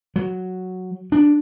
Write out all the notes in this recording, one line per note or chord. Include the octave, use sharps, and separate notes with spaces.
F#3
D4